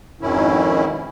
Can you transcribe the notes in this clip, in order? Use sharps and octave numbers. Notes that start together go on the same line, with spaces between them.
F2 G#2 B2 D#3 C#4 E4